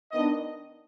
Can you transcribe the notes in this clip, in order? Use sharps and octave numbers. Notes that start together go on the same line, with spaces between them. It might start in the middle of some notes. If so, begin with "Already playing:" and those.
D#3 B3 D4 D#5